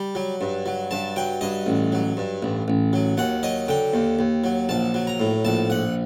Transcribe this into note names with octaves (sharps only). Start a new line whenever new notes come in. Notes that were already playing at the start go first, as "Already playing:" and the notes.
Already playing: G3
F#3
G2
F#3
G2 A5
F#3 G5
G2 D#5
A1
F#3
G2
A1
A1
F#3
D#2 F#5
F#3 D#5
D3 G5
D#2
D#2
F#3
A#1 A5
F#3
A#5
A2
A#1 A5
A#1 F#5